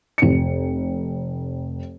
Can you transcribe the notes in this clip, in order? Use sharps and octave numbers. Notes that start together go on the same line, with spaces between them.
F1 C#7